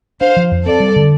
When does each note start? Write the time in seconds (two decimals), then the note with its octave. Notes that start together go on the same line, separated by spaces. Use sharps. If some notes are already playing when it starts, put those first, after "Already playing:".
0.21 D4 C5 F5
0.37 F3
0.51 F2
0.66 C4 A4 D5
0.80 G3
0.96 D3